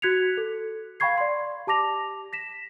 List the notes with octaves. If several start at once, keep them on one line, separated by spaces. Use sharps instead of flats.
F#4 F#6 G#6 B6 C#7 F7
A4
F5 G5 B5 C#6 G#6 C7
D5 C6
G4 A5 D6 A#6 F7
A#6 B6 E7